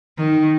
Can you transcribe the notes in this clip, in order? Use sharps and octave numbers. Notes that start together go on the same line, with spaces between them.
D#3